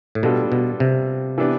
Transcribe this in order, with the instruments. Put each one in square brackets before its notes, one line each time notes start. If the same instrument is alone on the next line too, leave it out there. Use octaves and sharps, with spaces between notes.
[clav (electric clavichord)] A2
[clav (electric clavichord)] B2 [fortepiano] G3 B3 D4 F4 A4
[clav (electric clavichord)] B2
C3
[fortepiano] E3 B3 D4 G4 B4